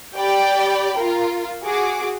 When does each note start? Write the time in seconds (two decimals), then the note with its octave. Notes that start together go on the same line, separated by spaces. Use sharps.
0.14 G4 D5 G5 B5
0.97 F4 A#4
1.63 F#4 G#4 D6